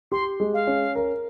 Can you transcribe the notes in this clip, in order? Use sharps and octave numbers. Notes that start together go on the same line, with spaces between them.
G4 C6
G#3
F5
C#4
A#4